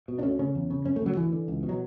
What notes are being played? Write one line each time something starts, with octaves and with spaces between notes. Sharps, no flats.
B2
D4
D2 C#4
C#3 C#4
E2
C#3
F#2 C#4
A3
C#3 F#3
D2 E3
D3
C#2
B2
F#3